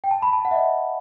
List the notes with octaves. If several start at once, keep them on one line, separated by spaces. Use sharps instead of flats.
G5
A5
B5
A5
F#5
E5
D#5